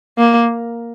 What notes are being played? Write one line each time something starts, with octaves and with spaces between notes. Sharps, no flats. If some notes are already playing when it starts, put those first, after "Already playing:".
A#3